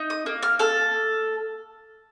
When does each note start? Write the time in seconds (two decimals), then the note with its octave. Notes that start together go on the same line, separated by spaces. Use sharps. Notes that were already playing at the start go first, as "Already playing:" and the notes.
Already playing: D#4
0.10 D#6
0.26 A#3
0.43 F6
0.59 A4 F6